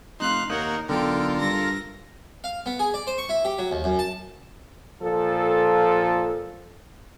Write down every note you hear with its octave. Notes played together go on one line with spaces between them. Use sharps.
F1 D#4 F5 C6 F#6
D#2 A#3 D#4 A#4 C#5 F#5
B1 D3 F4 A4 A#4 G5
G2 A#6
F5
B3
G#4
D5
C5
C#6
E4
G4
F#3
D#2
F#2
A5
A#2 F3 A4